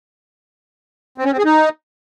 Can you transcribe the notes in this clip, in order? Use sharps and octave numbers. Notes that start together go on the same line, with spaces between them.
C4
C#4
C4
G#4
D#4